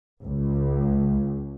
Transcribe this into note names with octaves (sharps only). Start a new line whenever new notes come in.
C#2